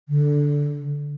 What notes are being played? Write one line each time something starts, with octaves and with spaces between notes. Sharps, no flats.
D3